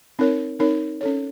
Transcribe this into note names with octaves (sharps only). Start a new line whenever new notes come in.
C4 D#4 A#4 C#5
C4 D#4 A#4 C#5
C#4 A4 C#5